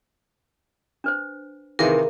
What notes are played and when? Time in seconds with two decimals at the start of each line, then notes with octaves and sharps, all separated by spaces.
1.04 D4 B4 C5
1.79 C3 D#3 E3 G#4 A#4 F5